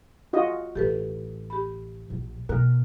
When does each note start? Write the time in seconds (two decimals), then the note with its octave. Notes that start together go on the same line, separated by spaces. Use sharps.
0.33 F4 F#4 D#5
0.75 A1 G4 A4 B4
1.50 G4 B5
2.10 A#1
2.49 B2 A#4 F#6